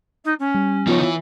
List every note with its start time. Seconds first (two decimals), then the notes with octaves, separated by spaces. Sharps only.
0.24 D#4
0.39 C#4
0.55 G3
0.87 F3 B3 D#4 F4 C#5
1.01 E3 E4